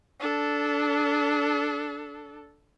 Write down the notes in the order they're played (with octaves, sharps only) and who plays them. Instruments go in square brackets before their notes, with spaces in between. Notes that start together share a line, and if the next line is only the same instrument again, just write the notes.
[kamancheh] D4 A4